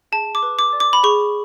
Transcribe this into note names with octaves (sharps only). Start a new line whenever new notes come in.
G#4 A5
D6
B4
D6
D5
D6
B5
G#4 C#6